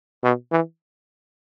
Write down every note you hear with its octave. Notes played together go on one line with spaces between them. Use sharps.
B2
E3